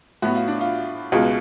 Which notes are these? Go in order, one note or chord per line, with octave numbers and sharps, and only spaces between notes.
A2 F#3 B3 F#4
F4
D4
F4
C#2 B2 G#3 F4